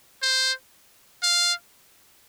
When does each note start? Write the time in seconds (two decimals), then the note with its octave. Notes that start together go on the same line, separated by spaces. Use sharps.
0.22 C5
1.23 F5